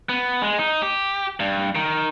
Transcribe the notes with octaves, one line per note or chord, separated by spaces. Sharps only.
B3
G#3
D#4
G4
G2
D#3